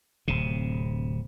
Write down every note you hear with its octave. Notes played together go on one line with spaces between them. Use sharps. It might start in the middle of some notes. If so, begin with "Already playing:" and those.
D1 C3